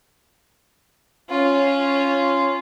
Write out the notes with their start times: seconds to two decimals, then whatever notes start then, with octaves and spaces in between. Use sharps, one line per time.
1.30 C#4 F4